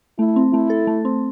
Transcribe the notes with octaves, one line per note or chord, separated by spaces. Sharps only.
A3 E4
C4
A3 E4
A4
A3
C4